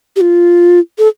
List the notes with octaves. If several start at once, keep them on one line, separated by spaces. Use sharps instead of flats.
G4
F4
A4